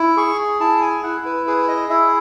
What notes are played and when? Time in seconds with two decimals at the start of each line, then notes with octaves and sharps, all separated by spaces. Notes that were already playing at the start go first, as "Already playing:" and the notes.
Already playing: E4
0.17 G#4 C#6
0.60 E4 A5
0.82 G#5
1.03 E4 F#5
1.25 B4
1.46 G#4 B4
1.68 D#5
1.89 E4 E5